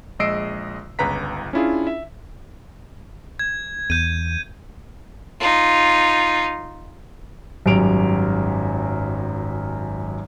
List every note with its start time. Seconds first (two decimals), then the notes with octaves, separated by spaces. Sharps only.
0.20 A#1 G#3 D#5 E6 C7 D7
0.99 G1 C#2 B4 A#5 B6
1.53 C#4 D4 E4 F4 G#4
1.87 E5
3.39 G#6
3.90 E2 G6 D#7
5.40 D#4 F4
7.66 G#1 F#2 F#3 G3 D7 F7